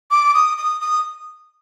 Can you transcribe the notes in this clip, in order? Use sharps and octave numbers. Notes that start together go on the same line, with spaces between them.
D6
D#6
D#6
D#6